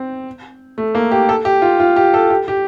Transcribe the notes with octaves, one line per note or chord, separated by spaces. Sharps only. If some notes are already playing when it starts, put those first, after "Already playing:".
Already playing: C4
A3
A#3
G4
A4
G4
F4
F4
G4
A4
G4
G4